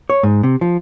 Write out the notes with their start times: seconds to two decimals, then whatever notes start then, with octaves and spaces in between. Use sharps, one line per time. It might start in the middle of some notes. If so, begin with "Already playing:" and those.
0.10 C#5
0.23 G#2
0.43 C3
0.61 F3